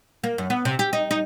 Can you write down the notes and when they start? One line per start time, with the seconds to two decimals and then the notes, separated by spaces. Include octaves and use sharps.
0.24 A#3
0.38 F#2
0.50 B3
0.65 C3
0.79 G4
0.93 D#4
1.11 D#4